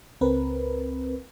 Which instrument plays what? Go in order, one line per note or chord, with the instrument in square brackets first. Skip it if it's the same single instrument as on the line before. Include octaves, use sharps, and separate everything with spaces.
[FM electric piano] C#2 C4 A#4 B4